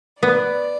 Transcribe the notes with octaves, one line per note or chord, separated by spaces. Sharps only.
B3 D5